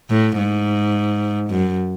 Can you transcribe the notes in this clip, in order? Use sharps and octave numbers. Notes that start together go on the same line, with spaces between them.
A2
G#2
F#2